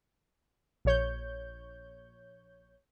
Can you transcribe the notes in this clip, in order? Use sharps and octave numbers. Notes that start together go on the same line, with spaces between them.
A#1 C#5 G6